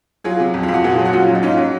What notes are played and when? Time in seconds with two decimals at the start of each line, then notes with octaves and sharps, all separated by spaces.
0.24 F#3 F4 G#4
0.40 C3
0.54 F2
0.63 F4
0.68 F2
0.74 F#4
0.84 A#2 F4 G#4
0.99 F#3
1.05 F#4
1.13 A#2 C#4 F4
1.28 F#3
1.35 D#4
1.43 G#2 C#4 F4
1.57 F#3